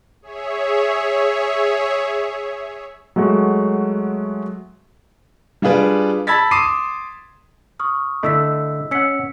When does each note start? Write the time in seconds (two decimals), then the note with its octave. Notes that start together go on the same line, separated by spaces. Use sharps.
0.22 G#4 C#5 E5
3.16 F#3 G#3 A3 F#4
5.62 G3 D4 F4 G#4 B4 D5
6.27 A5 B5 E6 G#6 A6 B6
6.51 C6 D6 D#6 C7 D#7 E7
7.80 C#6 D#6 F6
8.23 D3 A3 E4 D#5 E6 B6
8.91 C#4 F#5 E6 B6 C#7